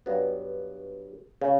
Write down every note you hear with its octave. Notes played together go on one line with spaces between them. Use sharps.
G2 F#3 B3
C#3